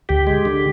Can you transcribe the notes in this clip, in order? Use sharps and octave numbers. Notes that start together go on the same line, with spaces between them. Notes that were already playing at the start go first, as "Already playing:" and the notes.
D2 G4
G#3
D3